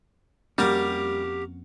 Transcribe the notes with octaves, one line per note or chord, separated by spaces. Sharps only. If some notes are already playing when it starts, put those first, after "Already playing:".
F2 G3 A#3 C#4 F#4 G4 A#4 F5